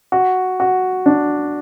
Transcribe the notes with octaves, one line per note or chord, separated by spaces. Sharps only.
F#4
F#4
D4